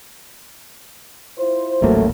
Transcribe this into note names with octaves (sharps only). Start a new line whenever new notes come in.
E4 F4 C5
D#1 A1 F#3 A3 A#3